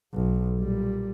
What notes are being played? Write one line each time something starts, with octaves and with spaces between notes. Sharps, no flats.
B1
A#2 G3